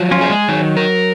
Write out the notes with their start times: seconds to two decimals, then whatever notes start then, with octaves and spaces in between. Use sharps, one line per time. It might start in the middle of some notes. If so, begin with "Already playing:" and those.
Already playing: F3 F#3
0.11 C#4 F4
0.21 G#4
0.30 G#3
0.48 D#3 F#3
0.77 A#4